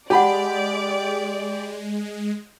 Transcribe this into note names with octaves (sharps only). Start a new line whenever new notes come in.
G#3 G4 D5 F#5 A5 B5